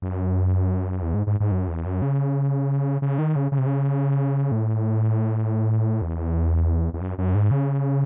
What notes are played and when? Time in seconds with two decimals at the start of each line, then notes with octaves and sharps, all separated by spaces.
0.02 F#2
1.02 E2
1.14 G#2
1.27 G#2
1.40 G#2
1.52 F#2
1.68 E2
1.86 F#2
2.02 C#3
3.02 C#3
3.19 D#3
3.36 C#3
3.52 C#3
3.58 C3
3.66 C#3
4.52 A2
6.02 E2
6.94 E2
7.01 F#2
7.18 F#2
7.35 G#2
7.51 C#3